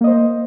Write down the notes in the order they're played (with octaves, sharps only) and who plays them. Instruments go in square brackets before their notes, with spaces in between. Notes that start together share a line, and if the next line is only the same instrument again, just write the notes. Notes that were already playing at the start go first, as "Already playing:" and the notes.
[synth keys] A#3
D#5
C5